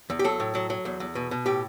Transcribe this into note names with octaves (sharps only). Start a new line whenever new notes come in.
E2
G4
F#3 A4
A2
F#3
F#3
E2
E2
B2
B2
A2 G4